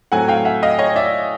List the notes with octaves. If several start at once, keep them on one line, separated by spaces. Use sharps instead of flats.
A2 F#3 A3 C4 F#5 G#5
F5 G5
E5 F#5
D#5 F5
C#5 D#5
D5 E5